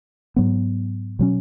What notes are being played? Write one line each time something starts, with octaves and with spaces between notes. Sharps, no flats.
G#2 F#3 B3
B2 F#3 C#4